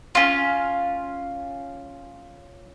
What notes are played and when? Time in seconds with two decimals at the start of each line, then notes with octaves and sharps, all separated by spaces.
0.15 C#4 F4